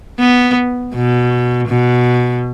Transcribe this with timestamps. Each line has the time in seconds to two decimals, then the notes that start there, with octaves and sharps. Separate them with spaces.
0.20 B3
0.94 B2
1.68 B2